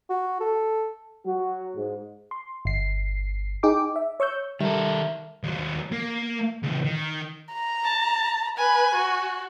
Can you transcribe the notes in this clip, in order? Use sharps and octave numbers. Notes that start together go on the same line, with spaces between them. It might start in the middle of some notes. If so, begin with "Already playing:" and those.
F#4
A4
F#3 F#4
G#2
C6
G1 C7
D#4 G#4 G5 D6
E5
C#5 C#6 E6 G6
D#3 G3 A4 A#4 E5
D#2 F#3
A#3
C#2 E3
D#3
A#5
A5
B4 G#5
F#4